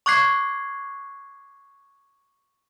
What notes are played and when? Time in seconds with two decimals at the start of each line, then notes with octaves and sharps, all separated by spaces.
0.06 C#6 D6 F#6 G#6 C7